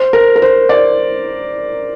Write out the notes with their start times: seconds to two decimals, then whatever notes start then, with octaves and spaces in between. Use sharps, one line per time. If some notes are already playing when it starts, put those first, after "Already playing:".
Already playing: C5
0.13 A#4
0.36 A#4
0.42 C5
0.69 D5